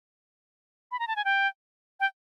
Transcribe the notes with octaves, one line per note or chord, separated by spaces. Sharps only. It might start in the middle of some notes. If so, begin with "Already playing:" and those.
B5
A#5
A5
G#5
G5
G5